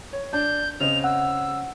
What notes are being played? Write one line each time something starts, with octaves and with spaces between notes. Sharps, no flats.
C#5
D4 D5 G6
C#3 C4 D#5 F7
F#5 E6